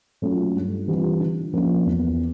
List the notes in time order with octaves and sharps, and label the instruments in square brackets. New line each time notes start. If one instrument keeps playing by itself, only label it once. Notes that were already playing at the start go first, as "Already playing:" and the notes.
[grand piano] F#3 A3 C#4 F4
G2
E3 G3 C4 F4
D3
F3 A#3 C#4 F4
E2